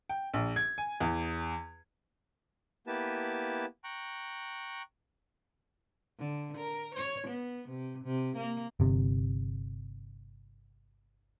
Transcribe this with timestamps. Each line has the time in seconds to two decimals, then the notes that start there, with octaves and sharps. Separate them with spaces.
0.09 G5
0.34 A#1
0.56 G#6
0.78 G#5
1.00 E2
2.87 A#3 B3 E4 G4 B4 A5
3.84 G5 A#5 C#6 F#6
6.19 D3
6.57 A#4
6.95 C#5
7.27 B3
7.68 C3
8.04 C3
8.37 A#3
8.80 G1 C3